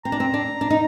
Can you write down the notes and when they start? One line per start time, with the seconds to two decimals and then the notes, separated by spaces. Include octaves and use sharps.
0.05 C4 A#5
0.12 D4
0.20 C4
0.34 D4
0.61 D4
0.70 D#4